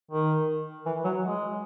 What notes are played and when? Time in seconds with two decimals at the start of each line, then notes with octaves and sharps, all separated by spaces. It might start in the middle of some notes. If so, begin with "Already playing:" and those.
0.11 D#3
0.86 E3
1.05 F#3
1.24 G#3